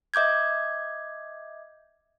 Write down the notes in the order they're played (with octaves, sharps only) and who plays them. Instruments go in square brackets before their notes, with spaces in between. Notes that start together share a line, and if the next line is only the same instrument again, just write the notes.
[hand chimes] D#5 E5 D6 G6 G#6